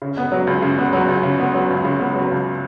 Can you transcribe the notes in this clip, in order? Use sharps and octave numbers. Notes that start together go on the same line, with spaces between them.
C#3
B3
F#3
C#2
C#3
B3
F#3
C#2
C#3
B3
F#3
C#2
C#3
B3
F#3
C#2